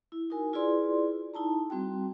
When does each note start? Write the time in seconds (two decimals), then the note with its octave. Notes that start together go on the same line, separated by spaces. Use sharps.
0.12 E4
0.30 D#4 F#4 A#4 G#5
0.53 E4 F4 G#4 B4 D5 C6
1.34 D#4 E4 A5 A#5
1.70 G3 C4 F#4 G5